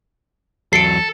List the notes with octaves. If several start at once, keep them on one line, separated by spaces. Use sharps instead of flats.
E2 F#3 A4 C7 D7